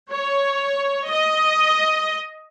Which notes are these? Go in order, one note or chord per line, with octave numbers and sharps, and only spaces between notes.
C#5
D#5